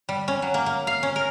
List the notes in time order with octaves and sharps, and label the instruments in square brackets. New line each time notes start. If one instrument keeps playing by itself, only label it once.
[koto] G3
C#4
F#3
A#3
A#3
F5
C#4
A#4